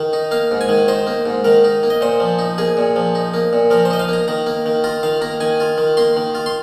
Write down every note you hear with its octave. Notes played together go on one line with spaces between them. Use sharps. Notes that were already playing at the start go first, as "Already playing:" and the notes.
Already playing: D#3
D#4
A#3 F5
G#2
G#5
D#3
D#4 C5
A#3
G#2
D#3 A#4
D#4
A#3
D#5
A#2 C5
F3
D#4
A#3 G#4
A#2
F3
D#4
A#3
A#2
F3 A#4
C5
D#4 D#5
F5
A#3 A#5
D#3 A#5
A#3
D#3
F4 A#5
D#3 F5
A#3 A#5
D#3 G#5
F4
D#3
A#3 C6
D#3
F4
C6